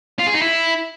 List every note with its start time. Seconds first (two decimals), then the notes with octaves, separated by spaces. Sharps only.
0.19 F4
0.27 G#4
0.34 D#4
0.42 E4